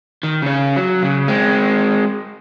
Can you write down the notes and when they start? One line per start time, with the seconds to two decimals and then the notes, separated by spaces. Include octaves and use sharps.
0.23 D#3
0.42 C#3 C#4
0.76 F#3
1.03 C#3
1.28 G#3 C4